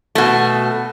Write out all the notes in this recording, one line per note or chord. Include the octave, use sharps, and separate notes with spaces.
B2 A3